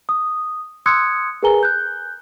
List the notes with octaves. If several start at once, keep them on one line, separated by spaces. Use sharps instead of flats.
D#6
C6 D#6 E6 F#6 G#6 C#7
G#4 A#4 B4 G#5 A#5 G7
F#6 G6